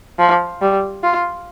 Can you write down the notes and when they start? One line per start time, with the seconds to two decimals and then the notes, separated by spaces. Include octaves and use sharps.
0.19 F3
0.62 G3
1.03 F4